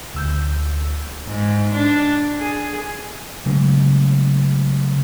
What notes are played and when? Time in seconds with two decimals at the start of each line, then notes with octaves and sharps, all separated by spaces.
0.14 D2 E6 G6
1.26 G#2
1.73 D4
2.40 G#4
3.46 C#3 F#3 G#3 A3